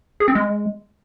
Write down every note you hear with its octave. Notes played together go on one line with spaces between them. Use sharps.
G#4
C4
G#3